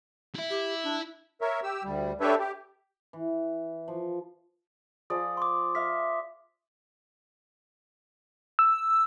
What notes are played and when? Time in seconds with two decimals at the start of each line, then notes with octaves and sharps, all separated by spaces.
0.35 E4 E5
0.50 G4
0.84 D4
1.41 A#4 C#5 E5
1.63 G4 E6
1.84 D2 G3
2.21 D4 G4 A4 B4 C#5 E5
2.39 G4
3.13 E3
3.88 F3
5.10 F3 G#4 D5 D#6
5.37 C6 D6
5.75 E5 F5 B6
8.59 E6